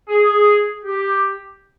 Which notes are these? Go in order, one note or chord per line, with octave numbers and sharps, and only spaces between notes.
G#4
G4